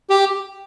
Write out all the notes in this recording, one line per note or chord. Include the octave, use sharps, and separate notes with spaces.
G4